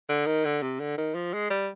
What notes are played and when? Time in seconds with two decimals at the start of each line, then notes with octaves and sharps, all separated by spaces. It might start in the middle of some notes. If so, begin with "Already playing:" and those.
0.09 D3
0.27 D#3
0.45 D3
0.63 C3
0.80 D3
0.98 D#3
1.15 F3
1.34 G#3
1.50 G3